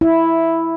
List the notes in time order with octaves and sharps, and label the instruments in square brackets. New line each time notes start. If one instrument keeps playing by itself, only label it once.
[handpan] E4